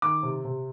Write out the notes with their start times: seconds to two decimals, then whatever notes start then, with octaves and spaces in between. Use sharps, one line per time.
0.02 D#3 D6
0.23 C3
0.45 C3